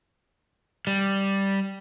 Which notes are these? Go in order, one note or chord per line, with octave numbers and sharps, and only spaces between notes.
G3